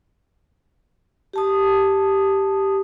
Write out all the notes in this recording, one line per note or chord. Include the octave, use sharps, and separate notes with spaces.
G4 A5 D#6